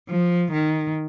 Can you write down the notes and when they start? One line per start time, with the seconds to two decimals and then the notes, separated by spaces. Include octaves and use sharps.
0.09 F3
0.52 D#3